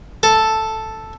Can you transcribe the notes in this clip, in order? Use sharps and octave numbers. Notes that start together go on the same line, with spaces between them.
A4